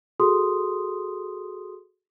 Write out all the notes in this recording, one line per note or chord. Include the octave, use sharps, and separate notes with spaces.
F#4 G#4 A4 C6 D#6